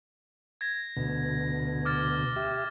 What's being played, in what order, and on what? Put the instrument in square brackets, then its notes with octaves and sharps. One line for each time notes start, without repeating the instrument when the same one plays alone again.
[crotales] G#6 A#6
[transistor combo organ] D2 B2
[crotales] D6 F6 A6
[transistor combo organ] G4 E5